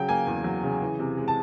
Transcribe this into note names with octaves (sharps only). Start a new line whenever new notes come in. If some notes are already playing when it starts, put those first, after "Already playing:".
Already playing: C#3 F#3 G5
A#3 G#5
E2
F#3
C#3
E3
C3
G#3
A5